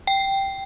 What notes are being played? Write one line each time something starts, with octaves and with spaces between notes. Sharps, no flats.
G5